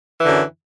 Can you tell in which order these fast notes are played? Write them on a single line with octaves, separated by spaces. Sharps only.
E3 D3 F#2